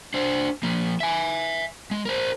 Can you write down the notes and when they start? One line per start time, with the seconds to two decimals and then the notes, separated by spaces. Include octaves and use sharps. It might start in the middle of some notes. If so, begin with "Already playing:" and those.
0.14 D4 C5
0.63 F3 A#3
1.00 E5 G#5
1.91 G#3
2.05 A#4 C5